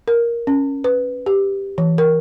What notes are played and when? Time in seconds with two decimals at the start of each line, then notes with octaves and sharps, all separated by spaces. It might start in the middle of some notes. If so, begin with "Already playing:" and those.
0.08 A#4
0.47 C#4
0.84 B4
1.26 G4
1.78 E3
1.98 A#4